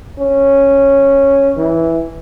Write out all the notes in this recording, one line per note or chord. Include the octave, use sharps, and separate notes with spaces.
C#4
E3